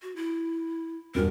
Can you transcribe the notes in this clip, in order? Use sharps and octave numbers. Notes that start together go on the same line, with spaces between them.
F#4
E4
E1 G2 F#4 A#4